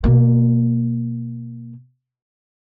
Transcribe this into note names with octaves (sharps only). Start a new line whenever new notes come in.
B2 A#3